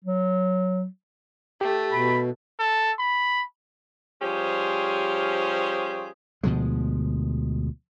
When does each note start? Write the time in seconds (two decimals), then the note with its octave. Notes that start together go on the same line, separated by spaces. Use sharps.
0.05 F#3
1.61 A3 G4
1.92 B2 B5
2.60 A4
2.99 B5
4.21 F3 G3 C#4 G4 G#4 C5
6.43 D2 B2 F3 G#3